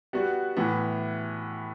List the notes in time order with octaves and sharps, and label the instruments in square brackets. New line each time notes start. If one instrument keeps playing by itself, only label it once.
[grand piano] G3 B3 F#4
A2 E3 B3